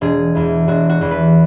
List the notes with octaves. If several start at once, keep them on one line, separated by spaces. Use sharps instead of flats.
E1 G#4
E2 E3
E1 F#4
F#4
E2 E3
B4